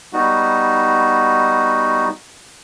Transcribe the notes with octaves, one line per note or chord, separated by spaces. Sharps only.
G3 B3 D#4 F#4